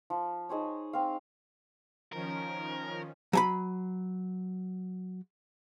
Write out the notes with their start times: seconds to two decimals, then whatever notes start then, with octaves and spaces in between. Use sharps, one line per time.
0.10 F3
0.49 D#4 G#4 C5 C#5
0.93 C4 F5
2.13 D#3 F3 C#4 A#4
3.33 F#3 G#5 B5